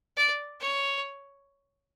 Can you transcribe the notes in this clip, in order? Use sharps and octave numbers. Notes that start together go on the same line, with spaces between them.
D5
C#5